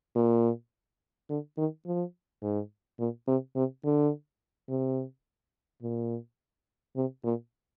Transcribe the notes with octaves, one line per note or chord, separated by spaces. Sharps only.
A#2
D3
D#3
F3
G#2
A#2
C3
C3
D3
C3
A#2
C3
A#2